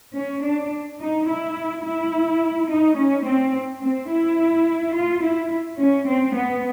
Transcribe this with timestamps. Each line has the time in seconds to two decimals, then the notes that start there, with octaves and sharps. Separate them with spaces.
0.16 C#4
0.44 D4
1.00 D#4
1.28 E4
1.84 E4
2.68 D#4
2.97 C#4
3.25 C4
3.82 C4
4.10 E4
4.95 F4
5.22 E4
5.79 C#4
6.07 C4
6.35 B3